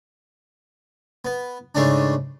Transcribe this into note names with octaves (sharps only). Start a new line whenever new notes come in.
B3
G#2 C#3 A3 C#4 D4